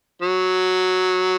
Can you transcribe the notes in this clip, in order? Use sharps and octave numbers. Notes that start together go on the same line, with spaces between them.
F#3